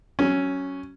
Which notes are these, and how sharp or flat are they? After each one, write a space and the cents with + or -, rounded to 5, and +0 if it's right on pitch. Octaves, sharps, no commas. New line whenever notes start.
F#3 +20 C#4 +0